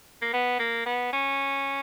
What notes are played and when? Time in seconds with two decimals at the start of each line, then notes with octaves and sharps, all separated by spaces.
0.22 A#3
0.33 B3
0.59 A#3
0.86 B3
1.13 C#4